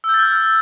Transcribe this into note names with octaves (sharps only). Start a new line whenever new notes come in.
E6
G6
A6
F6